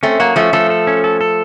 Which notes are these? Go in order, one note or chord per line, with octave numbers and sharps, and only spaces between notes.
A3 C4 C#4
F#3 A#3 F#4
F3 A3 C#4
F3 A3 A4
A4
C#4
A4
A4